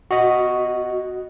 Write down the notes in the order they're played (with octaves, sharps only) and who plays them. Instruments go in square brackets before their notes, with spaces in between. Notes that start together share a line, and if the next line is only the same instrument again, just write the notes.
[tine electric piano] F#4 D#5